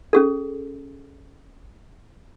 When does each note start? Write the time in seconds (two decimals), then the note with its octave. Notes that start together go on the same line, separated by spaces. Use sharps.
0.13 C#4 G#4 A4